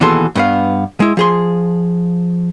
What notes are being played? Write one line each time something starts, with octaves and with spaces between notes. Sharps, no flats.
D#2 B2 E3 G#4 A4 C6
G2 B3 F5
G#3 E4
F3 G#4 C6